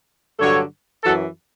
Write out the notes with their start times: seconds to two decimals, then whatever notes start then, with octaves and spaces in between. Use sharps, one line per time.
0.39 G2 D3 F#3 A4 C#5
1.04 F#2 E3 F#4 A4